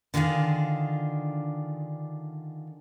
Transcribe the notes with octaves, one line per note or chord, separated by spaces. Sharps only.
D3 D#3 D4 F4 G#4